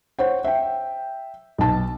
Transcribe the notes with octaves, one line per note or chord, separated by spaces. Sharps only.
C5 C#5 F#5
E5 G5
B1 A5